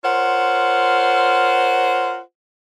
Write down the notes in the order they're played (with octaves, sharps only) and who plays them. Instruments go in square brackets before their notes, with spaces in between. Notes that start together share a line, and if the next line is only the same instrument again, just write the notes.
[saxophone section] F4 A#4 C5 C#5 F#5